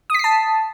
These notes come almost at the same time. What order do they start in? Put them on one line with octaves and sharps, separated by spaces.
D#6 B6 C7 A5